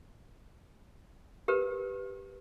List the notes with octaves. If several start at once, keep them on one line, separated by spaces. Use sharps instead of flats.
G4 A#4 B4